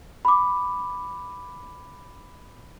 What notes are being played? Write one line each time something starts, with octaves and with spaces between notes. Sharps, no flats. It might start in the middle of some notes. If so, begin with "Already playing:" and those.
B5 D6